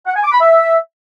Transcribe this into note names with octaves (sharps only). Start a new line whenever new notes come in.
F#5
G#5
D6
B5
E5